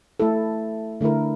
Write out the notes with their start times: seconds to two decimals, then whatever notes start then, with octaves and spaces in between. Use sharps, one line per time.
0.20 A3 E4 A4
1.01 D3 A3 E4 A#4